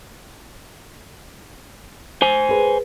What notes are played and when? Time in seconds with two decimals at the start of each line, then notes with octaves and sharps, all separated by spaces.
2.22 C5 G#5
2.49 G#4 B4